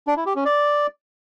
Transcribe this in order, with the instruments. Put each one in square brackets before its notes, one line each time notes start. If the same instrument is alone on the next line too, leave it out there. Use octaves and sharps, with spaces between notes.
[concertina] D4
E4
G4
C#4
D5